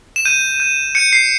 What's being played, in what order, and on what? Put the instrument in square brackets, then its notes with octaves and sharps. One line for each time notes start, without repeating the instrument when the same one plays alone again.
[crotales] E7
G6 D#7
G6
G6 C#7
C7